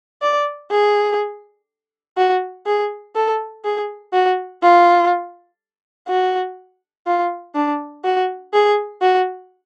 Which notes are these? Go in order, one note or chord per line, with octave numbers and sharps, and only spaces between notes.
D5
G#4
F#4
G#4
A4
G#4
F#4
F4
F#4
F4
D4
F#4
G#4
F#4